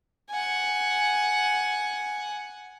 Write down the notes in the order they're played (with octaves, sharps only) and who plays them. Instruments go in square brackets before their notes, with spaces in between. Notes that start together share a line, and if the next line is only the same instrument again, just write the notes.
[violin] F#5 G#5